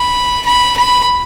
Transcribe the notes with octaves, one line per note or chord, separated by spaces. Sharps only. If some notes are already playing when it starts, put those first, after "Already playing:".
Already playing: B5
B5
B5